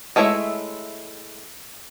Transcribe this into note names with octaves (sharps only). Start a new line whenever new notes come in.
G#3 A3 E4 C#5 E5